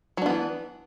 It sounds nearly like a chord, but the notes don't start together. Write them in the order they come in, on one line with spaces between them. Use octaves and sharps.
F#3 D4 B3 E3